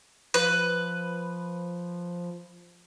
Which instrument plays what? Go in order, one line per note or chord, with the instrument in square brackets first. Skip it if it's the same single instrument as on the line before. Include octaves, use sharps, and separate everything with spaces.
[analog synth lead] F3 [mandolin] B4